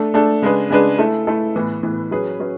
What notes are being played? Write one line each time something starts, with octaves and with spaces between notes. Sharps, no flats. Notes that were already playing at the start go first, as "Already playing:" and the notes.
Already playing: A3 D4 A4
A3 D4 A4
C#3 G#3 D4 G#4 B4
C#3 G#3 D4 G#4 B4
A3 E4 A4
A3 E4 A4
A2 E3 B3
A2 E3 B3
F#3 C#4 G#4 B4
F#3 C#4 G#4 B4